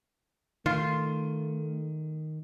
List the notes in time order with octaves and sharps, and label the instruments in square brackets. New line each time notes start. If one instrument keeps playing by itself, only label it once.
[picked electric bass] D#3 [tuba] A3 [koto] F4